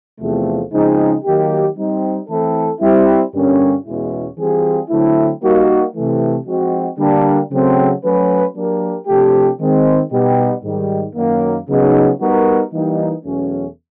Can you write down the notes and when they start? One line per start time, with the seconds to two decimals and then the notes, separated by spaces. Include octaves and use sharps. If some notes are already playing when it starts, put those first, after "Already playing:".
0.20 E2 C3 F3 A3
0.72 C#3 F3 G#3 C4 D#4
1.25 D#3 F#3 A#3 D#4 G4
1.77 G3 C4 D#4
2.28 E3 A3 C4 E4 A4
2.81 G3 C4 E4
3.33 G2 D3 G3 A#3 C#4
3.85 E2 B2 G#3 C#4 E4
4.38 E3 G3 C4 F4 G#4
4.89 D3 F#3 A3 C4 E4
5.42 G3 A#3 D#4 F#4
5.94 C3 E3 A3
6.46 F3 G#3 C4 D#4 F#4
6.98 D3 G3 A#3 D4
7.50 C#3 F#3 A3 C4
8.03 F#3 A3 C#4 F#4 B4
8.55 F#3 A#3 D4 G4 A#4
9.07 C3 F3 A3 D4 G4
9.59 D#3 G#3 C4
10.11 B2 G3 B3 D#4 G4
10.63 G#2 D#3 G3
11.16 F#2 D#3 F#3 A#3
11.67 C#3 F#3 B3 D#4
12.20 G3 B3 D#4 F#4 A#4
12.72 E3 G3 A#3 D#4
13.24 E2 B2 F#3 A3 C#4